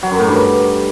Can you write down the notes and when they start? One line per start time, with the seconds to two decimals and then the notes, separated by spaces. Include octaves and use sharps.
0.03 F#3
0.11 F#2
0.19 A2
0.27 G2